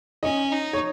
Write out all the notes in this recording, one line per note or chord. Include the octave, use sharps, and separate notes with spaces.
C#4 D#5
D#4
C#5